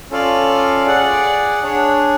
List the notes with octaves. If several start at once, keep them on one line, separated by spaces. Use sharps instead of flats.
C#4 F4 A4 D5 F5
G#4 D5 F#5
D4 G#4 C#5